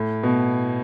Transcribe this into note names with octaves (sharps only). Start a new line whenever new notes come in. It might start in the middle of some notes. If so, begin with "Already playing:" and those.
Already playing: A2
B2